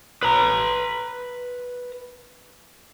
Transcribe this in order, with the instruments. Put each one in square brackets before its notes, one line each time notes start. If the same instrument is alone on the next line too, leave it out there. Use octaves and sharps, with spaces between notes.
[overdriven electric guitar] B4 A#5